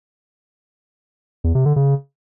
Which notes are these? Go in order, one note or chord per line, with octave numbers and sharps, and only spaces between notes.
E2
C3
D3
C#3